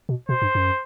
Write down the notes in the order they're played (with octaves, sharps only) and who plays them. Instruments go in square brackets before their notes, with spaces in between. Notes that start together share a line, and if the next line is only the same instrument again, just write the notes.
[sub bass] B2
[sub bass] B2 [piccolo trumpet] C5
[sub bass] G2
F#2